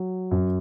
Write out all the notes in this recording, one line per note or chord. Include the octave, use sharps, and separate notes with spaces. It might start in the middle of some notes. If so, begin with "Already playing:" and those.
Already playing: F#3
F#2